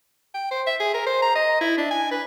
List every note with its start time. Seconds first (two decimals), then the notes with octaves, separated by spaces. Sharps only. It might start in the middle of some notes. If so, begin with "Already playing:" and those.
0.34 G5
0.51 C5
0.67 E5
0.80 G#4
0.94 A#4
1.07 C5
1.22 A#5
1.35 D#5
1.61 E4
1.78 D4
1.91 G#5
2.11 B4